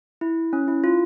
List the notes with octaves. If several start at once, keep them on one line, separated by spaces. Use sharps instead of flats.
E4
C#4
E4
F4